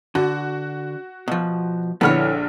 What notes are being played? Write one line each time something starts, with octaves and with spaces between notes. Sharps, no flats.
D3 F#4
B2 F3
A#1 D3 B3 E4 C#5 F6